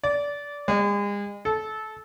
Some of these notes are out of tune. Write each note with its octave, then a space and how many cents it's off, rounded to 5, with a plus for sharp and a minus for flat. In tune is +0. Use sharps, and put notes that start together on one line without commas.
D5 -20
G#3 -40
A4 -20